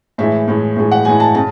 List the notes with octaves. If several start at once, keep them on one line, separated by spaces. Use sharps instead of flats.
A2 E3 G#3 E5
A2 E3 G#3
A2 E3 G#3
F#5
A2 E3 G#3 G#5
A5
C#3 A5